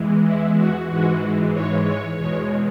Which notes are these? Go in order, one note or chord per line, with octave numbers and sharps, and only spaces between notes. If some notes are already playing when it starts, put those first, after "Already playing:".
Already playing: E2 E3 G#3
E4
F#4
G#2 E3 G#3 F#4
C#5
C#5
E2 B2 G#3 C#5